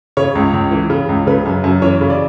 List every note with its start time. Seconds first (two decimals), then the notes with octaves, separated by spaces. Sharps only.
0.17 C#3 C#5
0.35 C#2
0.54 C#2
0.71 E3
0.90 C#3
1.09 C#2
1.27 C#3 B4
1.46 F#2
1.64 F#2
1.82 E3 C#5
2.01 C#3
2.10 D5